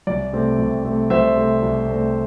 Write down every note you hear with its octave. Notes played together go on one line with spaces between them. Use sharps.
C2 D5
C3 A3 C4
C2
C3 A3 C4
C2 C5 E5
C3 A3 C4
C2
C3 A3 C4